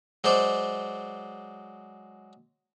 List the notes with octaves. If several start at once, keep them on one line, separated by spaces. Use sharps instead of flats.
F#3 G#3 C5 D5